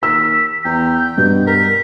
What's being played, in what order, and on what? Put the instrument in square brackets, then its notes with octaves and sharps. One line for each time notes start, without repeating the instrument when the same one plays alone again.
[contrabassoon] D#2 [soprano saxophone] A#4 [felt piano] E6 [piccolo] B6
[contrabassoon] E2 [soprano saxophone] G5 [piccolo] A#5
[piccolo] G6
[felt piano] G2 [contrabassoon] B2
[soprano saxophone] A#4 [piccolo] B6